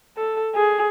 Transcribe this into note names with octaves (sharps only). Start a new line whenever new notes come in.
A4
G#4